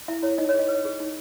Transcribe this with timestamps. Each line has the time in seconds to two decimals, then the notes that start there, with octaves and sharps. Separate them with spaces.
0.08 E4 E5
0.23 E4 C#5
0.38 D#4 D#5
0.49 C#5
0.54 G#4 D#5
0.68 B4
0.85 G#4
1.00 D#4